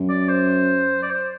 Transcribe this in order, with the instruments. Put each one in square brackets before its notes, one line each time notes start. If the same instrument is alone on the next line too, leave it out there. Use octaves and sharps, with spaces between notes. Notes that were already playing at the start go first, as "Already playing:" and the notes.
Already playing: [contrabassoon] F#2
[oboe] D5
C5
D5
C5